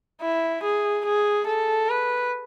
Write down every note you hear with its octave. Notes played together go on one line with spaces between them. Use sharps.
E4
G#4
G#4
A4
B4